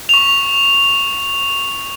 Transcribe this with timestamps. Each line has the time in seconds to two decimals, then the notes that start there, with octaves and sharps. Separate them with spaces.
0.09 C#6 F7